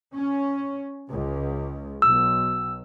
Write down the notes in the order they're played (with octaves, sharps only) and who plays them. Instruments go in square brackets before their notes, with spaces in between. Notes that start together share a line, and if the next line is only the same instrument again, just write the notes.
[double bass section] C#4
C#2
[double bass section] B1 [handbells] E6